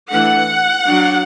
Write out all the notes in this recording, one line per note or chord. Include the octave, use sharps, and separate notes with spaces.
E3 A3 D4 F#5
F#3 D4